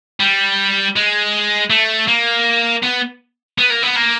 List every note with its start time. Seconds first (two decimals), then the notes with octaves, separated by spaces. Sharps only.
0.20 G3
0.96 G#3
1.70 A3
2.08 A#3
2.83 B3
3.58 B3
3.70 A#3
3.83 B3
3.96 A#3